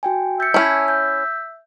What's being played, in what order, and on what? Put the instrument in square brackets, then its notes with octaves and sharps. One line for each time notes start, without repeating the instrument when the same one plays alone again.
[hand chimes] F#4 G5 G#5
[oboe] E5 [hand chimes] G6 A6 C#7
[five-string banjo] C#4 E4 [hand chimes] G#5 A5
[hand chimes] G6